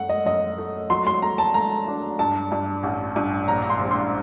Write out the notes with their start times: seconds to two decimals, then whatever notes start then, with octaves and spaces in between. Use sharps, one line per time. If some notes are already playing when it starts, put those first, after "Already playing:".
Already playing: F#2 A3 F#5
0.09 D#5
0.26 F#2 D#5
0.58 A3
0.90 F#3 C6
1.07 C6
1.22 A3 A#5
1.38 A5
1.54 A3 A#5
1.88 D4
2.19 G2 A5
2.52 G2
2.83 A1
3.16 G2
3.48 A#1 A#5
3.70 C6
3.80 A#1
3.91 C6